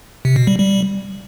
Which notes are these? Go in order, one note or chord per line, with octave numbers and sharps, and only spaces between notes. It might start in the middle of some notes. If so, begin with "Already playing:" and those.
C3
B2
G3
G3